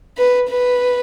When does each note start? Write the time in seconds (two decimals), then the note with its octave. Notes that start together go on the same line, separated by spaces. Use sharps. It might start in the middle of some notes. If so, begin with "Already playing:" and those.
0.18 B4
0.49 B4